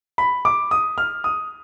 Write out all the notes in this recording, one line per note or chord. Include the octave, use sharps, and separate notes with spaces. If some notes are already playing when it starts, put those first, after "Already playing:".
B5
D6
D#6
F6
D#6